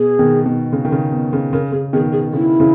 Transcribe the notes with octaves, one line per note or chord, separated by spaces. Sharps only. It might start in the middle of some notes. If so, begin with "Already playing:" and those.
Already playing: B2 G#4
B2 D#3
B2 D#3
C#3
D#3
C#3
B2
C#3
C#3 A#4
C#3 G#4
B2 D#3 G#4
G#4
C#3 E4
C#3 E3